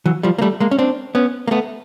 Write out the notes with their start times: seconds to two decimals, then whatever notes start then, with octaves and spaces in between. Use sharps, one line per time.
0.06 E3 F#3
0.23 F3 G3
0.38 A#3
0.42 G3 A3
0.60 G#3 A#3
0.71 C#4
0.79 C4 D4
1.15 B3 C#4
1.48 A#3
1.51 A3 B3